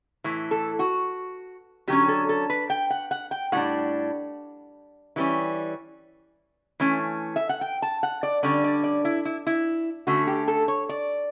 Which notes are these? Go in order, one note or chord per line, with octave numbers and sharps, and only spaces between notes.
A2 E3
A4
F#4
D3 F#3 C#4 G4
A4
A4
B4
G5
F#5
F#5
G5
A2 G3 D4 F#5
E3 G3 C#4
E3 A3 C#4
E5
F#5
G5
A5
F#5
D5
D3 G3 C#4 D5
D5
D5
E4
E4
E4
D3 A3 C#4 F#4
G4
A4
C#5
D5